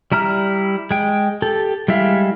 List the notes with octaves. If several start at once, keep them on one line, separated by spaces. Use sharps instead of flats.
G3 E4 A#5 F6
G#3 G5
G4 A4
G3 G#3 E4 E5 F5